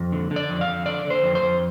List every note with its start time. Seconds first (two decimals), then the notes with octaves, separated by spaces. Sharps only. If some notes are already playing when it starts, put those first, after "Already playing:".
Already playing: F2
0.12 D3
0.31 D3
0.36 D5
0.49 F2
0.61 F5
0.67 F2
0.86 D3 D5
1.05 D3
1.10 C5
1.23 F2
1.35 C5
1.42 F2